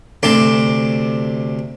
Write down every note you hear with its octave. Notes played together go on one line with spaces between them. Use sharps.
D2 C3 A5 C6 D6